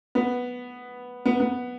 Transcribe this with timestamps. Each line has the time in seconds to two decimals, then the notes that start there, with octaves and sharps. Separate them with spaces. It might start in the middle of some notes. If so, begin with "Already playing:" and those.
0.15 B3
1.26 B3
1.40 B3